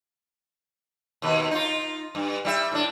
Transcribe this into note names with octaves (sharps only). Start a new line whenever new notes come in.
D#2 B2 B4
D#4 F4
G2
G3 E4 E5
A2 D4